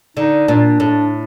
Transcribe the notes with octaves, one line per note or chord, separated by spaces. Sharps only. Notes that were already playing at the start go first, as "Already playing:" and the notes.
D3 D#4
A#2 D4
A2 D4